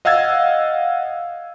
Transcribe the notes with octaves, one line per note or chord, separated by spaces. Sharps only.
D#5 F5 F#5 E6 G#6 A6